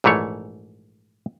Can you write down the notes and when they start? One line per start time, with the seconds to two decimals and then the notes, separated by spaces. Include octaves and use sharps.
0.04 A#1 G#2 E3 A3 C#5